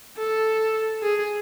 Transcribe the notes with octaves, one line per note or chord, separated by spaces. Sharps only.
A4
G#4